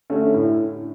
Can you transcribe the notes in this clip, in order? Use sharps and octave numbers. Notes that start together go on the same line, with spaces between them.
D3 A3 C#4
A2